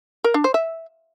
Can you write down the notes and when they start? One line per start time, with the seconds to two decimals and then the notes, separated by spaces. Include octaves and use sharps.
0.24 A#4
0.34 D4
0.44 C5
0.54 E5